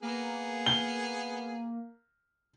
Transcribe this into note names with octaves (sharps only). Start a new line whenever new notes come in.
A#3 B3 G#4
G7